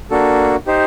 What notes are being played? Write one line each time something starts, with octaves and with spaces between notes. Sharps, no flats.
A#3 D4 F#4 A4
D#4 G4 C5